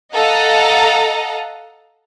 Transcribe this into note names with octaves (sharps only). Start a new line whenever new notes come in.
A4 D#5 F5 F#5 A#5